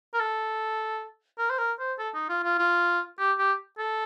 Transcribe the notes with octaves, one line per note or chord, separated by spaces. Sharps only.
A#4
A4
A#4
C5
A#4
C5
A4
D#4
F4
F4
F4
G4
G4
A4